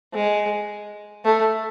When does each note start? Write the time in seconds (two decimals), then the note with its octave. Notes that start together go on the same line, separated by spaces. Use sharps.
0.14 G#3
1.25 A3